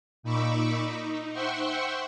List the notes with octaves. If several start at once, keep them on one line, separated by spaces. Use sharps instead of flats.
A#2 D#4 B5 C#6 D6 E6
D#4
C5 E5 F#5 G5 C6 C#6